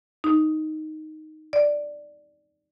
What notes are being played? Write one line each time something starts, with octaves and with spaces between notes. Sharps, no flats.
D#4
D5